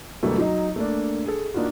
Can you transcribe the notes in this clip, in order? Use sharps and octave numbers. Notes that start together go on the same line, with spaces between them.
D2 B2 F#3 G3 A3 A#3
F#3 D#4 D#5
A3 A#3 D4
G#4 A4
A#3 D4 D#4 F4 F#4